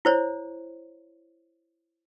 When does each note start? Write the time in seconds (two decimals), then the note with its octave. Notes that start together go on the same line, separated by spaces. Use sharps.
0.05 E4 C5 C#5